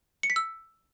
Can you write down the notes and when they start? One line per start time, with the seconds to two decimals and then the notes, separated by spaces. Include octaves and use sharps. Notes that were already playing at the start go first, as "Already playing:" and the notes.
0.23 C#7
0.30 B6
0.36 E6